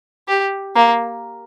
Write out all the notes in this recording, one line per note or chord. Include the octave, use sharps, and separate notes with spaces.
G4
A#3